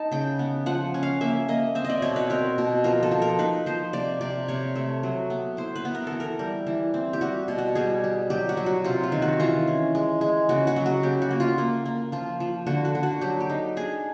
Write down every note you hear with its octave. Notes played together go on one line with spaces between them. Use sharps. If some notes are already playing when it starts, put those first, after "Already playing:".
Already playing: D#4 A5
C#3 G5
B3
F3 F#5
C#4
F5
A#3 E5
A#3 D#5
C4 E5
D#5
D5
B2 C#5
B4
C4 A#4
B2
F3 A#4
A4
F3
A#4
D#4 B4
F3 C5
C3 D5
C3 D5
C3 C#5
A3
F#3
B3
E4 C5
B4
B3
A#4
A4
E3
A#4
G3
E3
C4
G4
G3 F#4
B2
F#4
G3 G#4
G3
F#3 G4
F#4
F#3
F#4
C3 F4
F4
D#3
F#4
E3 F4
C#4
G#3
G#3
C#3 F#4
F#4
F#3
F#4
C#3 G4
F#4
A#3
F4
A#3
A#3
F3 F4
F3
D3 F#4
F#4
D3
F#4
F#3 G4
G4
D#4
D4 G#4